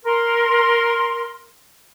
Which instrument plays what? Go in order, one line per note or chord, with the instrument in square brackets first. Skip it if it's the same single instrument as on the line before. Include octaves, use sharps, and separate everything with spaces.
[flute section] A#4 C6